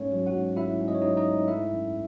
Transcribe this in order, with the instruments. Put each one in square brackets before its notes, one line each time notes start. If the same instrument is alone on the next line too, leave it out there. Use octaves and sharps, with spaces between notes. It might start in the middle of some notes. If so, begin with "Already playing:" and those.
Already playing: [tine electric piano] G#2 A3 C#4 C#5
F#3
F#4 F#5
G#2
A3 E4 E5
G#2
D#5
C#5
F#3 D#4 D#5
D#4 D#5
G#2
A3 E4 E5
F#2